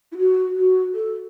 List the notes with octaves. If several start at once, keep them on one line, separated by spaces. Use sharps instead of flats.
E4
F#4
F#4
A4